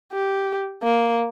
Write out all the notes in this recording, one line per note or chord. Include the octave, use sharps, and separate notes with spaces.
G4
A#3